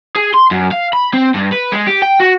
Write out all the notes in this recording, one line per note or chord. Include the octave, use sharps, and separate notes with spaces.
G#4
C6
F#2
F5
B5
C4
G2
B4
G#3
G4
G5
F#4